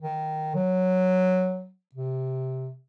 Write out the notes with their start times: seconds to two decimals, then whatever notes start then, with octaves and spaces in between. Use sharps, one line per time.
0.02 D#3
0.55 F#3
1.95 C3